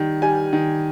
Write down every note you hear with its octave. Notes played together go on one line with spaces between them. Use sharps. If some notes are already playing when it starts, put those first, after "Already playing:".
Already playing: D#3 G3
G3 G#5
D#3